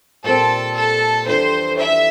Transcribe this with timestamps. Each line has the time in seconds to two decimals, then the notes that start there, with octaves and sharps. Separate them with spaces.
0.24 A#2 G3 C4 A4
0.75 A4
1.27 F2 E3 G3 D4 A4 C5
1.79 E5